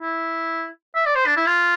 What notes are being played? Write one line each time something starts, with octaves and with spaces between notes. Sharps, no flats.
E4
E5
D5
C5
D4
E4
F4